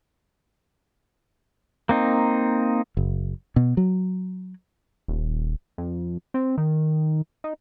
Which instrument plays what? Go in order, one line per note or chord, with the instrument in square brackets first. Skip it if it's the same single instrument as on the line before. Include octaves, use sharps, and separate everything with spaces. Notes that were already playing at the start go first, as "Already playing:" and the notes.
[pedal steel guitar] A#3 C4 D#4
[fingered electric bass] F#1
B2
F#3
[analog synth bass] D#1
F2
C4
D#3
D#4